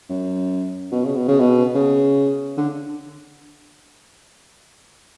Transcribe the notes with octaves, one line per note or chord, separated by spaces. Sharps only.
F#2
B2
C#3
B2
C#3
B2
C#3
D3